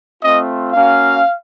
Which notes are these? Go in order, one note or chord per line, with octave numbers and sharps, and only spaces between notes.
A3 C4 F4 D#5
A#3 C#4 F#4 F5